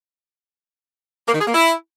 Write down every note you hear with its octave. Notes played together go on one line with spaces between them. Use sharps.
A#3
D#3
G#4
A#3
E4